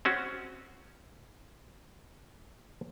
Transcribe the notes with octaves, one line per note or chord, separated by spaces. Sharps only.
C4 C#4 F#4